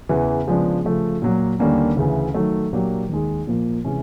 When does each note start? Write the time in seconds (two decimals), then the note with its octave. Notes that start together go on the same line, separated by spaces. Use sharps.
0.09 E2 C#3 E3
0.47 C#3 F3 G#3 B3 D4
0.85 C#3 F3 A3
1.22 A#2 F#3 A#3
1.59 D#2 D3 G3 A#3 C#4
1.97 D2 C#3 E3
2.34 D#3 F#3 A3
2.72 A#2 F#3 A#3 D4 G4
3.09 D#2 D#3 G#3
3.47 A#2 F3 A#3
3.85 C3 E3 G#3 C#4